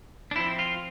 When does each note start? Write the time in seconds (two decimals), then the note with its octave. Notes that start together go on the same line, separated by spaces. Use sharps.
0.31 D4
0.36 F3 C4 E4
0.59 F4